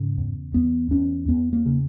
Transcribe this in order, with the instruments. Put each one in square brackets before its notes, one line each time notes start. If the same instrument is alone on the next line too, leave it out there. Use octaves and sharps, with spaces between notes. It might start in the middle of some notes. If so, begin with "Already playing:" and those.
Already playing: [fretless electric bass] G#2 C#3
E2
E2 B3
E2 C#4
E2 B3
A#3
C#3